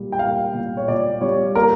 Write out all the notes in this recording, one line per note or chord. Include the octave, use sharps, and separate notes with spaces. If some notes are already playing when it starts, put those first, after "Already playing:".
Already playing: A#2 G3
G5
A#3 F5
A#2
C#5
A#2 D5
G3 C#5
A#3 A#4